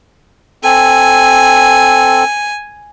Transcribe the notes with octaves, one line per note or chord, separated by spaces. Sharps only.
C4 A4 G#5